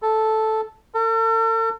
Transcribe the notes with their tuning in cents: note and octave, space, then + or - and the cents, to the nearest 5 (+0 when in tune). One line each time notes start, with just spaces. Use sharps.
A4 -5
A4 +45